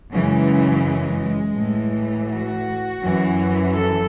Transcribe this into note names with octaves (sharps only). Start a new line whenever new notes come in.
F#2 C#3 E3 G#3
A2 E3
F#4
F#2 E3
A4